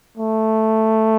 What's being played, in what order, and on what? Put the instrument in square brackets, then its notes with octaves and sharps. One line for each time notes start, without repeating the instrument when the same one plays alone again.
[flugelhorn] A3